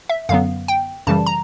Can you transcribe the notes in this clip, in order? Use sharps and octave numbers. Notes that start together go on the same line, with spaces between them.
E5
F#2 D3 F#3 B3 F5
G5
F#2 C#3 E3 G3 A5
A#5